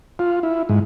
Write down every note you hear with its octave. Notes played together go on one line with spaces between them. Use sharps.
F4
E4
G#2